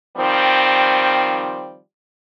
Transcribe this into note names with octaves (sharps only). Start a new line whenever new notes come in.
D#3 F3 G3 C4